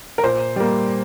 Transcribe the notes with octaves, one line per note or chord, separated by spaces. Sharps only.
A#4
A#2 C5
G3 A#3